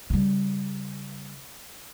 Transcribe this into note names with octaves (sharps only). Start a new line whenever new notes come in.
C#3 G3